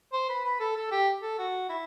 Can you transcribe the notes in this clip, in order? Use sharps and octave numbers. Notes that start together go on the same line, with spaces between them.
C5
B4
B4
A4
A4
G4
A4
F#4
E4